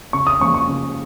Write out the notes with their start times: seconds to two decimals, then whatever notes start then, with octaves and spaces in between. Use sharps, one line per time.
0.13 C#3 C#6
0.27 D#6
0.40 F3 A#3 C#4 C#6
0.54 C#6
0.68 C#3